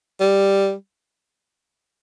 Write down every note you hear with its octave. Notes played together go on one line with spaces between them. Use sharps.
G3